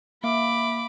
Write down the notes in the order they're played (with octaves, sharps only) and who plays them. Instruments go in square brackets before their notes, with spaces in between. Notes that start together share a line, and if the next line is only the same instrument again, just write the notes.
[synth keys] A#3 E5 F5 [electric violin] B5 D6